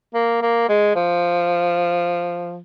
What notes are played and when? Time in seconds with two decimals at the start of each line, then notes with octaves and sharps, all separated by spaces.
0.14 A#3
0.42 A#3
0.69 G#3
0.96 F3